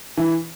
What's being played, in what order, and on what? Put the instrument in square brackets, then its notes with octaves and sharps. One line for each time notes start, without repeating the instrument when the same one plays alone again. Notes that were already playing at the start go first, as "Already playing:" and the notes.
[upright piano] E3